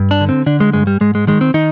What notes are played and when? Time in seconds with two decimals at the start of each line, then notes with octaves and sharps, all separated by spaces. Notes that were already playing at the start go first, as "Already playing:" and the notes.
Already playing: G2
0.11 D4
0.21 D3
0.29 C4
0.46 D3 D4
0.60 G#3
0.73 G2 G#3
0.87 G3
1.01 G#2 G#3
1.15 G#3
1.27 D#3 G#3
1.41 C4
1.54 D#3 D#4